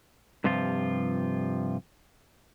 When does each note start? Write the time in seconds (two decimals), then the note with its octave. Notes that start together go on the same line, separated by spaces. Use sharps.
0.44 G2 C3 F3 F4